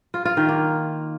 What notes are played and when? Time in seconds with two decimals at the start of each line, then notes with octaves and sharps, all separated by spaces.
0.14 F4
0.25 F4
0.37 D#3
0.49 A#3